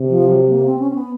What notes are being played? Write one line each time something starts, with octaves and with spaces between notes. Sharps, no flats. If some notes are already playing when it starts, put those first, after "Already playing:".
Already playing: C3
F3
F#3
A#3
C4
C#4
C4
B3